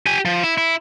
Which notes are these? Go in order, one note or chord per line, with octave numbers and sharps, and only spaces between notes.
G4 G#5
F3
E4
E4